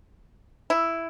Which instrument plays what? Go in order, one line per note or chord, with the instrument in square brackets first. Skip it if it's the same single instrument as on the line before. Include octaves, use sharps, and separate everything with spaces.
[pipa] E4